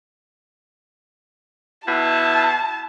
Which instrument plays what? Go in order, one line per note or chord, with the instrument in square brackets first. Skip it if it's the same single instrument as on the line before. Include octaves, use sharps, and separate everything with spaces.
[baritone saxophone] B2 [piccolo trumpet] E4 [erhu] A5